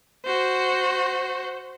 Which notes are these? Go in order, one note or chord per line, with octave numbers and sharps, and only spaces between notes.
F#4 C5